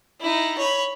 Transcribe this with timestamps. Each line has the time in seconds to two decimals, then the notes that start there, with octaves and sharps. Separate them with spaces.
0.21 D#4 E4
0.58 C#5 B5